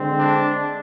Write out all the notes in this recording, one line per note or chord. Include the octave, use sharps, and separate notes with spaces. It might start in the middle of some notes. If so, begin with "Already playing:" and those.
Already playing: D3 G#3 C4
D4